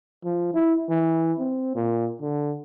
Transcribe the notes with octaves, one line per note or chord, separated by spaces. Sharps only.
F3
E4
E3
C4
A#2
D3